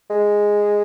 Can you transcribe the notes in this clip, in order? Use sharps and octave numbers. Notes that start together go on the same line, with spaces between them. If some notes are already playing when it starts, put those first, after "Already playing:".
G#3